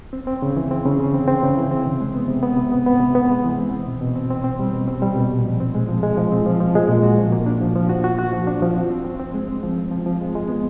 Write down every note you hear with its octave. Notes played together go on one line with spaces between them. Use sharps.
C4
C4
C#3
E3
C4
C#3
C#3
C4
C4
C#3
E3
C4
C3
G#3
B3
C3
B3
C3
B3
B3
C3
B3
G#3
E3
C4
C4
B2
B2
C4
C4
C4
G3
B2
C4
G3
B2
A#2
F3
C4
G#3
F3
G#3
F3
C4
F3
F3
G#3
A#2
F#4
F3
A#3
D4
F3
F3
F#4
F#4
F#4
F3
D4
F3
C4
C4
C4
C4
G#3
C4
F3
C4
F3
F3
G#3
G#3
B3